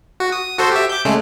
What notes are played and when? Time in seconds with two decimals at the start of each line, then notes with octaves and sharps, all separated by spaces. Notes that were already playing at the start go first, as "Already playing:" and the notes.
0.20 F#4
0.32 D#6
0.58 F#4 A4 C5
0.71 G4 E5
0.89 D6 G6
1.05 C#3 G#3 A3